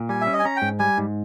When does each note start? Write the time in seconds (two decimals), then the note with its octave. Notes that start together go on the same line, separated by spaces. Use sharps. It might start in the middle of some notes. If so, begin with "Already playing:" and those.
Already playing: A#2
0.09 G3 G#5
0.21 E5
0.27 C#4
0.33 D#5
0.39 G#5
0.45 C#4 A#5
0.56 G5
0.62 G#2
0.80 G3 G#5
0.98 G#2